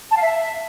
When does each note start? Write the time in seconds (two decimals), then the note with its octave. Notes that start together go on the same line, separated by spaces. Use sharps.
0.11 A5
0.16 F5
0.22 E5